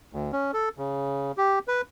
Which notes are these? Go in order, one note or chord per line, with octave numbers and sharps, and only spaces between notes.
D2
C#4
A4
C#3
G4
B4